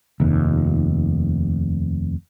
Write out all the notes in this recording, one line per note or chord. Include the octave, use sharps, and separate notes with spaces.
F1 D#2